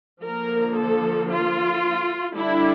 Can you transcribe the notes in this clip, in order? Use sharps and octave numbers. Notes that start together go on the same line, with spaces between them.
D3 F3 A#3 A#4
A4
F4
D3 G3 D4 E4